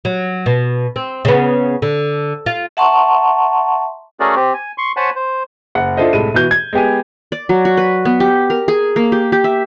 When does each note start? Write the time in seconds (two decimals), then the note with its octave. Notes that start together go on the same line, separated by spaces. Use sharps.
0.05 F#3
0.46 B2
0.96 C4
1.25 C#3 B3
1.82 D3
2.46 F4 F5
2.77 E5 F#5 A5 A#5 C6 C#6
4.20 A3 C#4 F#4 G#4 A#4 D5
4.36 C4 G4
4.54 G#5
4.78 C6 C#6
4.97 C5 C#5 F#5 G#5 A5 B5
5.16 C5
5.75 F#1 F#5
5.97 D4 E4 F4 A4 C5 D#5
6.13 C2 A2 G#3 A4 D#7
6.34 B2 E3 F#4 G6
6.51 G#6
6.73 G#3 B3 G4 G#5
7.32 D5
7.49 F#3
7.65 F#4
7.77 B4
8.05 B3
8.20 G4
8.50 A#4
8.68 G#4
8.96 A#3
9.12 G4
9.32 G4
9.44 E5